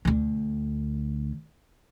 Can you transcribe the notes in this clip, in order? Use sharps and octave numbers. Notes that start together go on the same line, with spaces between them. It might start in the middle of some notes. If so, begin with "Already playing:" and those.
D2 D3